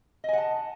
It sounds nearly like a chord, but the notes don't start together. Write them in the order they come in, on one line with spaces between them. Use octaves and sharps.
D#5 G#5 F#5 A5